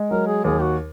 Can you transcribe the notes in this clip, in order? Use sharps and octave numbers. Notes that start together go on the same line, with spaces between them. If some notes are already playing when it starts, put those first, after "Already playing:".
Already playing: G#3
F#3 A#4
G#4
D#2 G#4
F#4